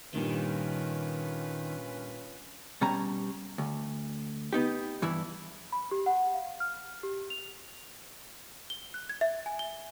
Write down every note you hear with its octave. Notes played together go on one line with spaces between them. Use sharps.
G2 A#2 D#3 G3 C#4 F4 B4
B2 G3 C#4 A#5
D2
B3 D#4 G4
G2 E3 E4
B5
G4
F#5
F5
F6
G4
F7
G7
F#6
G#6
E5
G#5
G7